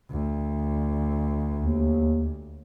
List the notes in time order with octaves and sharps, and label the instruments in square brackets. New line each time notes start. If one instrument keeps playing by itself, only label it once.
[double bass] D2
[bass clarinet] D#2